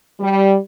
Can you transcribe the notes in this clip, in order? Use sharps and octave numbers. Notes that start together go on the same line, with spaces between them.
G3